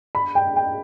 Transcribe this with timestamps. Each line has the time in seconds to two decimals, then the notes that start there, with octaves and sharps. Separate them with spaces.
0.15 B5
0.35 G5
0.56 G5